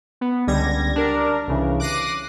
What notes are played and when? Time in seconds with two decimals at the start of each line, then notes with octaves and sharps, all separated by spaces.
0.21 B3
0.47 C#2 D3 G3 G#6 A#6
0.96 D4 A#4
1.47 C2 C#3 E3
1.80 D6 F#6 A#6 C7 D#7